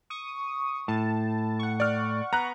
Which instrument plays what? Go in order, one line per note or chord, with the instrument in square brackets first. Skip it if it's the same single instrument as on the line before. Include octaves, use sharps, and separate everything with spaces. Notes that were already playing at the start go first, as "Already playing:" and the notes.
[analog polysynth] C#6 D#6
[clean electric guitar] A2 [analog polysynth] A5
[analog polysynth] F#5 C#6
[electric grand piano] D5 F6
[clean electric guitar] B3 [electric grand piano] A#5 F#6